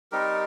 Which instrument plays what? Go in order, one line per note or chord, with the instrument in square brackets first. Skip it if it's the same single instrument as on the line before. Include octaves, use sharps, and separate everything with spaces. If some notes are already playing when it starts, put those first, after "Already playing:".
[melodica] G3 C4 D#4 G4 A#4